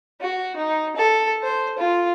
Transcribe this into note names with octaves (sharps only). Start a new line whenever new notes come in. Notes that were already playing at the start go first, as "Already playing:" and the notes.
F#4
D#4
A4
C5
F4